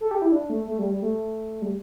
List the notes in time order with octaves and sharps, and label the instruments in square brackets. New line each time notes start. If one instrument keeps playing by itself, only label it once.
[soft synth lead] A4
G4
E4
D4
A3
A3
G3
G3
A3
G3